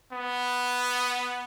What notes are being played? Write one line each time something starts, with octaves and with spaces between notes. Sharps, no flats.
B3